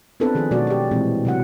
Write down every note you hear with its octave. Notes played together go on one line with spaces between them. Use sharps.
B3 C4 D4 F4 A4 B4
D#3 F3 G#4
B2 F#3 A3 F#4 D5
G4 D5
A#2 E3 G#3 C4
C3 F#3 F#5